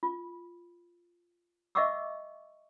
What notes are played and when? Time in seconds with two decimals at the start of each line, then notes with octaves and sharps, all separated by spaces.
0.03 F4
1.75 D#5 E5 F#5 C#6 D6 E6